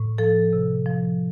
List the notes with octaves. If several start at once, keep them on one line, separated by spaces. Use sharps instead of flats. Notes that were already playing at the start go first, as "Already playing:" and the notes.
Already playing: A2
F3 A4
C3
F3